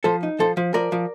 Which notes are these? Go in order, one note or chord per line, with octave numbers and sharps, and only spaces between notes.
F3 A4 C5
D#4
F3 A4 C5
F3
F3 A#4 D5
F3